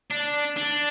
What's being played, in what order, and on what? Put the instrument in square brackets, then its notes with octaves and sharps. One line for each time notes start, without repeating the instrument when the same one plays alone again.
[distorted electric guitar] D4
D4